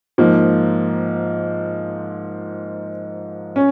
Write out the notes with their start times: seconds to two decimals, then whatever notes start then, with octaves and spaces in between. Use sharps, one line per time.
0.18 G#2 F3 A#3
3.56 C#4